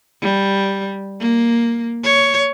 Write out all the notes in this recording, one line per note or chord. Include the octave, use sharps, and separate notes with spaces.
G3
A#3
C#5